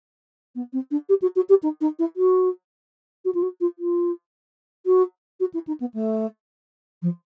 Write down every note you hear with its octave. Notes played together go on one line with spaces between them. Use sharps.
B3
C4
D4
G4
F#4
F#4
G4
D#4
D#4
E4
F#4
F#4
F4
F#4
F4
F4
F#4
F#4
E4
D#4
B3
A3
F3